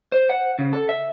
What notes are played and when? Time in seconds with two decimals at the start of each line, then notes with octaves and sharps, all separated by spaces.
0.12 C5
0.29 F#5
0.59 C#3
0.73 A4
0.89 E5